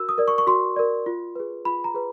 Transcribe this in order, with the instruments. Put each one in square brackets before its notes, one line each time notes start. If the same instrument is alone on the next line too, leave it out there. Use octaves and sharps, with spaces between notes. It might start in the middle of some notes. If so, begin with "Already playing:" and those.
Already playing: [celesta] F#4 A#4 E6
D#6
A#4 D5
C#6
C#6
F#4 C6
A#4 D5
F4
G#4 B4
F4 B5
A#5
G#4 B4